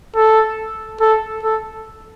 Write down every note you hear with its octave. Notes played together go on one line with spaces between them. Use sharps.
A4
A4
A4